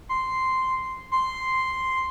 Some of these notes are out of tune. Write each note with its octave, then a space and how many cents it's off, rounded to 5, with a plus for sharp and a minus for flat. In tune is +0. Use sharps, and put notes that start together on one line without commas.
C6 -5
C6 -5